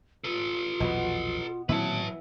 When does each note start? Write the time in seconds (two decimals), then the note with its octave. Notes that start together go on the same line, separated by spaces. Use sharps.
0.24 F4 A4 B4
0.80 A#1 E2 B2 F#3 B3
1.69 A#2 D#3 E3 F#3 C4 E4 B4 A5